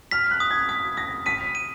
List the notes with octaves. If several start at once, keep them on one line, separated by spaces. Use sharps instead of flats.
F6 B6
F#6
D#6
G#6
D#6 B6
D#6 A#6
B6 D#7
D#7